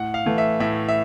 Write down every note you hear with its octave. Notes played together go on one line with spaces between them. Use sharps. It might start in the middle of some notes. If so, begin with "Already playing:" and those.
Already playing: A2 F#5
F5
E3 A3
E5
A2 E5
E5